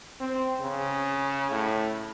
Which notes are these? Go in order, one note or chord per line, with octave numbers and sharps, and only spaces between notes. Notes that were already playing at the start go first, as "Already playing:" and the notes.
C4
C#3
A2